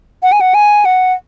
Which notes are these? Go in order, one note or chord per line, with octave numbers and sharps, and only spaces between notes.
F#5
G#5
F#5
G#5
F#5